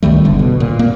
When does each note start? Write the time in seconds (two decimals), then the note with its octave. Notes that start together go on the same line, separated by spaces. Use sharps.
0.03 C#2 D#3 G3 A3
0.25 F#1 D3 B3
0.39 B2
0.60 A#2
0.79 A#3